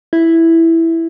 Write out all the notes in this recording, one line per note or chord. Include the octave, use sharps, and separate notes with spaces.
E4